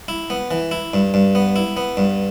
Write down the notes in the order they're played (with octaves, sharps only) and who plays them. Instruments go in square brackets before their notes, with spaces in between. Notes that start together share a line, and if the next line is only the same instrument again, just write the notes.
[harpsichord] E4
B3
E3
E4
G2
G2
B3
E4
B3
G2